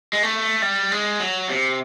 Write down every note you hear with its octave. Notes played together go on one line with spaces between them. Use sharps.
G#3
A3
G3
G#3
F#3
C3